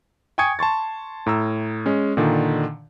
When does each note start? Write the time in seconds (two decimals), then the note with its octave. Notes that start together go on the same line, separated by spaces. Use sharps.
0.38 G5 G#5 C#6 D#6 G#6 C#7
0.59 A5 C6 C#6 A6
1.26 A2 A#5 E6
1.86 G#3 C#4
2.17 A#2 D3 D#3